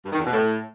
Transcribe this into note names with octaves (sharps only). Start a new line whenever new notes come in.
G2
D#3
E2
B2
A2